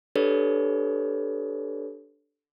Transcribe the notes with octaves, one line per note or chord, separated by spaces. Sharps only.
D4 G4 A4 B4 C#5 D5